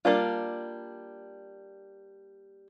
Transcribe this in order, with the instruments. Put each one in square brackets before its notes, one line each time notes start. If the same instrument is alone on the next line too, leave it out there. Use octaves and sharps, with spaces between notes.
[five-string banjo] G3 A#3 D4 F4